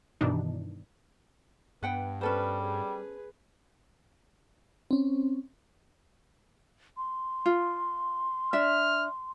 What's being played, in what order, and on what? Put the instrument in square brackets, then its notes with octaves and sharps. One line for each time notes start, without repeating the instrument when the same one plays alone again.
[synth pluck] G2 B2 D#3 E3 D4 D#4
[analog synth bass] G2 [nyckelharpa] B3 [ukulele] B4 F#5 G5
[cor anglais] G3 [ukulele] C#4 A4 C5 [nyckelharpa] B4
[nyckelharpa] G#4 B4
[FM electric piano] C4 C#4
[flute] C6
[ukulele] F4
[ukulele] D4 E5 [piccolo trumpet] F6